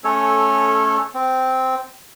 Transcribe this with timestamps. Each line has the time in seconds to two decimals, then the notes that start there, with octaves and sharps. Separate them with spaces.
0.04 A3 C#4 A4 C#5
1.14 C4